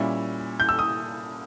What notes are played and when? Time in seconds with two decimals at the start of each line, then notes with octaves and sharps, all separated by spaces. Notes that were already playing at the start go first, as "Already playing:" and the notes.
Already playing: A#2 G3 C#4 E4
0.60 G6
0.69 E6
0.79 D#6